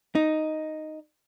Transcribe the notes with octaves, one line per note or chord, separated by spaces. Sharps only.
D#4